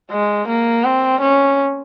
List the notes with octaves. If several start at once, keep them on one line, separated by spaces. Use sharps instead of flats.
G#3
A#3
C4
C#4